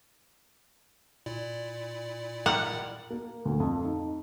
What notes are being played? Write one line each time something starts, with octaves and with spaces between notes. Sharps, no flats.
A#2 E4 D5
G3 G4 A#4 F#5
A#3
D2
F2
D#4